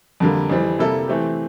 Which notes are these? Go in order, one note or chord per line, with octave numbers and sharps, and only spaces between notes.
F2 D3 G3 A#3
F2 E3 G3 C4
C3 G3 A#3 E4 A4
E3 A3 C4 G4